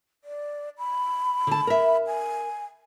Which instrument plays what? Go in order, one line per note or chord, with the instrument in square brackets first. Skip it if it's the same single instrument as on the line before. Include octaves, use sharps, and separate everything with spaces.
[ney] D5
B5
[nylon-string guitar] D3 A5
A#4 E5
[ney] G#5